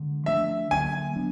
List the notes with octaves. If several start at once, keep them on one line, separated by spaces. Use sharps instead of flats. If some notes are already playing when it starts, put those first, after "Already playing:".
Already playing: D3 G#3
F3 A3 D4 E5
D3 F#3 A#3 G#5
F#3 B3 D4